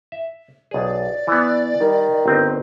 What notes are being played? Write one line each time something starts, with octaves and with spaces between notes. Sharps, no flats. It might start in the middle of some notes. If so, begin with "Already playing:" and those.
E5
B1 G#4 D5
E3 B3
D#3 G3
G1 C4 D#5